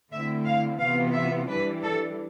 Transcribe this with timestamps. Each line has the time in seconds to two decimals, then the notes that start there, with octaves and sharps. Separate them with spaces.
0.12 D3 A3 C4 E4 E5
0.46 F5
0.80 C3 E3 B3 F4 F5
1.14 E5
1.48 E3 G3 D4 B4
1.82 A4